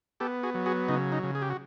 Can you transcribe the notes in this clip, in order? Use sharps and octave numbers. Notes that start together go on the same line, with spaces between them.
B3 G4 A4
F#4 G#4
F#3
F#4 G#4
C#3 D#4
D#4
C#3
G#4
G4
F#4